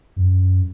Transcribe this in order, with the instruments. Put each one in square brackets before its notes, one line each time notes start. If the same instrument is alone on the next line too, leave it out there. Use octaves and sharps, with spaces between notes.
[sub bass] F#2